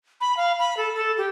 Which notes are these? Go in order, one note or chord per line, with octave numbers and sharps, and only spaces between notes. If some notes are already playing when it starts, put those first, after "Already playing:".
B5
F5
B5
A4
A4
G4